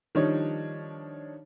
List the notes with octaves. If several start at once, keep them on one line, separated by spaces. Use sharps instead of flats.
D#3 F3 G3 D4 D#4 C#5